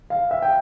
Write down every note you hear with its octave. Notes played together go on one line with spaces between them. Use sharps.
F5
E5
G5